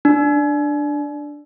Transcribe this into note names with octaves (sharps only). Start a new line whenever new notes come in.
D4